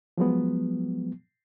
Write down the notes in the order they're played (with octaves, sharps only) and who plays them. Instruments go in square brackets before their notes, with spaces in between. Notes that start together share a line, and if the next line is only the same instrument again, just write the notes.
[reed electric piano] F3 F#3 G#3 B3